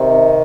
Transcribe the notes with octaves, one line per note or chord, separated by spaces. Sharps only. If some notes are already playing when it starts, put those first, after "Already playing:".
Already playing: C3 D#3